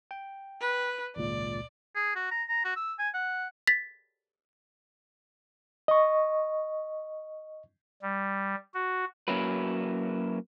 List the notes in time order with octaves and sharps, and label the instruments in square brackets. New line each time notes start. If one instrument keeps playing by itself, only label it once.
[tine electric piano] G5
[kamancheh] B4
[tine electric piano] G#1 C#2 A#2 [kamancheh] D5
[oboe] G#4
F#4
A#5
A#5
F#4
E6
G#5
F#5
[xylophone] A6 B6
[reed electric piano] D#5 C#6
[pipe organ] G3
F#4
[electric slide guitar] F#3 A#3 C#4 E4 F#4 B4